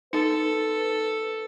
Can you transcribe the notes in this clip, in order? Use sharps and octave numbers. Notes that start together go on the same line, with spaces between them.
D#4 A4 B4